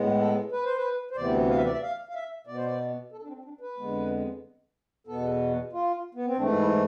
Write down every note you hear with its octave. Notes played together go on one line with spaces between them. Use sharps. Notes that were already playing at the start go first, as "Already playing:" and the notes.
Already playing: A2 G#3 B3
A4
B4
C5
B4
C5
D2 C3 E3 B3 D5
F5
E5
D5
E5
F5
F5
E5
B2 B3 D5
C5
D5
A4
D4
C4
D4
B4
F2 D3 G#3 B3
E2 B2 B3 A4
F4
B3
C4
G#2 E3 A3 D4
E4